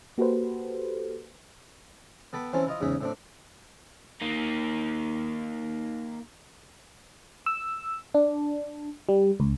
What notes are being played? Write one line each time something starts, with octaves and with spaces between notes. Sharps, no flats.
A#3 F#4 G4 A4 B4 C5
B3 A4 G5 B5
E3 C4 C#4 E4 A4 C5
E4 F4 D#5
E2 G#2 C#3 G#4 E5
A2 C4 D4
A#3 D#4
E6
D4
G3
C#2